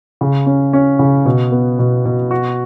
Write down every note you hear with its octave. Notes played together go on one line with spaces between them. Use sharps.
C#3
C#4
C#4
C#3
B2
B3
B2
B2
F#4